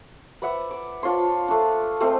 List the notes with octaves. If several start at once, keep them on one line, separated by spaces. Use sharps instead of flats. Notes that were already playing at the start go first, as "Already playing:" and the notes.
B4 D5 E5 F#5
D6
D4 F4 C#5 C6
A3 D4
G#3 A3 C4 C5